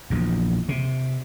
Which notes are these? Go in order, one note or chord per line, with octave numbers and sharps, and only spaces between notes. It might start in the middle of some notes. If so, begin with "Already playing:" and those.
A#1 E2
C3